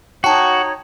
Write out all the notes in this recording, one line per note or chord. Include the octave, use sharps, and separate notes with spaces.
D#4 F#4 C#5 G5 A5